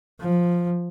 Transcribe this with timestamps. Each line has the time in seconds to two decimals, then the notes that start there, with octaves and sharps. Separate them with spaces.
0.21 F3